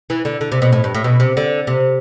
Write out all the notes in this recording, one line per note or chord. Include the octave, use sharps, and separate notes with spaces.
E3
D3
D3
C3
B2
A2
G2
A2
B2
C3
D3
C3